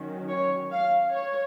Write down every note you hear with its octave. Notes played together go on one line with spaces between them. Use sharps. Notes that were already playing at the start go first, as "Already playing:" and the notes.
Already playing: D#3 F#3 C#4
C#5
F5
C#5